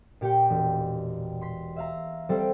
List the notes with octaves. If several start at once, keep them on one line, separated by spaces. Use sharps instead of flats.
A#2 G4 G5 C#7
E1
C6 B6
E5 F5 A#5
G3 C4 A4 C5